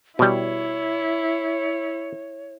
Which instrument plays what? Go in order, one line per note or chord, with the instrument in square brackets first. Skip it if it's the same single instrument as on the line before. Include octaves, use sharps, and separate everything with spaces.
[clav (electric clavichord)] B2 G3 [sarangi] E4 [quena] C#5